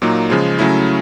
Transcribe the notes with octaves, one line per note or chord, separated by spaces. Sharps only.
A#2 F#3 A#3 D#4
C#3 F3 G#3
C#3 F#3 A3 C#4 E4